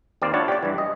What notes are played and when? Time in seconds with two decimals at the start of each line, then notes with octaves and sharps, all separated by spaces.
0.22 D#2 C4 D5 F5
0.34 D4 E4 F4 C#5 F#5 A5
0.48 G4 D5
0.63 G2 E3
0.78 D#5